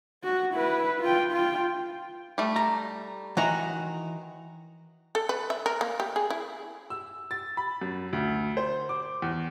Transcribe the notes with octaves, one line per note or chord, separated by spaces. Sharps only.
F#4
E4 B4
F4 G5
F4 G5
G3 A3
A#5
D#3 E3 F#4 A#5
A4
B4
E5
A#4
A#3
G4
G#4
E4
E6
A6
B5
F#2
D2
C5
D6
E2